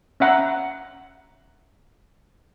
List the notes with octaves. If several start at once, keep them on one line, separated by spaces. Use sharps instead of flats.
C#4 E5 F#5 A#5